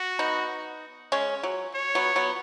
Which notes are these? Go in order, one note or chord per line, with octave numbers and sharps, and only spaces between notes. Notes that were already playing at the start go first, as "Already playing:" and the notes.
Already playing: F#4
B3 D#4
G#3 C#4
F#3
C#5
F#3 B3
F#3 B3